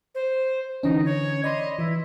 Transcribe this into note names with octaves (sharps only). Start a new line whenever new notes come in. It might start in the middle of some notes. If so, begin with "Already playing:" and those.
C5
D3 E3 C#4 D#4
C#5
D5 D#5 B5 C6
E3 E4